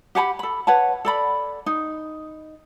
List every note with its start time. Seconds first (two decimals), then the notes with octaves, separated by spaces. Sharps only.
0.15 G4 F#5 G#5 B5
0.39 A4 B5
0.67 B4 C#5 F#5 A5
1.05 A4 D5 B5
1.66 D#4